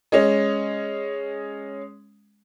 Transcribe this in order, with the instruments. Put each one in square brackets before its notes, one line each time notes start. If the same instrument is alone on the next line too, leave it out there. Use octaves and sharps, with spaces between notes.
[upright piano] G#3 C#4